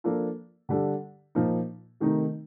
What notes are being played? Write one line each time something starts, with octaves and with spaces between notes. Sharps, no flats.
F3 A#3 D4 F4 A4
D3 G3 D4 A4
A#2 F3 A#3 D#4
C3 D#3 A3 D#4 A#4